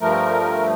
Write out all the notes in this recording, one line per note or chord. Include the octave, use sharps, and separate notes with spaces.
G2 F3 A3 A#4